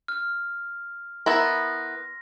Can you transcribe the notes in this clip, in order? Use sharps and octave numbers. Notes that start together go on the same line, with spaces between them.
F6
B3 E4 A#4 C6 A#6